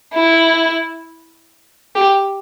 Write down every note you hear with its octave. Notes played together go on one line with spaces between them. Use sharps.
E4
G4